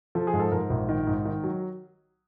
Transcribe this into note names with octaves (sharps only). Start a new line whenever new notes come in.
F3 A4
G#4
G#2
A4
G#2 A#4
A#1
D#3
G#2
D#3
F#3